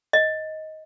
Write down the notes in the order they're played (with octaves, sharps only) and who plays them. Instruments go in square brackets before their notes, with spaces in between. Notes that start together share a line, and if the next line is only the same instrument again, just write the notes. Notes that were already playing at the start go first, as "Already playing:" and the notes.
[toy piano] D#5